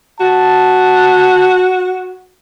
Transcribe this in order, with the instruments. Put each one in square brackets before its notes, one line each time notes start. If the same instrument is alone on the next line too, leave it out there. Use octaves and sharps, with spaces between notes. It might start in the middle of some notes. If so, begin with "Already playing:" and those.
[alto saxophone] F#4 [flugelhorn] A5